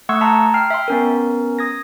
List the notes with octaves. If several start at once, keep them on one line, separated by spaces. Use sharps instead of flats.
A3 F#5 C6 C#6 E6 G#6
E5 A5 A#5 C6
G5 F6 C7
E5 G5 C6
B3 C#4 A#4
D#6 G#6 A#6